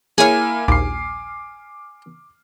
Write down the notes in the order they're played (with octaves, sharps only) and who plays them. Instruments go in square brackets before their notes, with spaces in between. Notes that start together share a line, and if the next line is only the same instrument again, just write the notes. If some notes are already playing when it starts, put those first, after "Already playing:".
[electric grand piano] A#3 E4 F6 [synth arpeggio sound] G#4 C#5 [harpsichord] G#5
[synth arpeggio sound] A#1 D#2 A#2 [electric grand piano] D6 C7